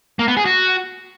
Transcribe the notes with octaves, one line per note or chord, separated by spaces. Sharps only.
A#3
B3
G#4
F#4